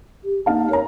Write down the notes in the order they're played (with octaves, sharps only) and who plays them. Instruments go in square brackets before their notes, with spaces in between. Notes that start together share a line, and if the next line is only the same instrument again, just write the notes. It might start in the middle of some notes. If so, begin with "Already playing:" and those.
[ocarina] G4
[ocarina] A#3 [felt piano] D#4 F5 A5
[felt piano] A#4 A#5 [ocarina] C#5